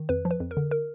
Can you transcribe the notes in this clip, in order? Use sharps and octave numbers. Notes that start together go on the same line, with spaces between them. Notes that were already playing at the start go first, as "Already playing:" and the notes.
Already playing: D#3
F2 B4
F3
B4
F2
A#4
D3
A#4